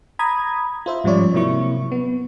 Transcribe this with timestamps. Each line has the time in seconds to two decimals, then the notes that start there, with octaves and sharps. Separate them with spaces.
0.19 A#5 B5 D#6 G#6
0.86 F4 C5 E5
1.04 G#2 F3 G3 C#4 C#5 D5
1.34 C3 F#3 A#3 E4 C#6
1.92 B3